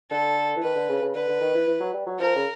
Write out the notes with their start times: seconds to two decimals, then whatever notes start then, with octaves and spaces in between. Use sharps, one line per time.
0.11 D3 A4
0.56 E3
0.63 D#3 B4
0.76 D3
0.89 C#3
1.02 C#3
1.15 D3 B4
1.28 D3
1.41 D#3
1.54 E3
1.67 E3
1.80 F#3
1.93 G3
2.06 F#3
2.20 F3 A#4
2.35 C#3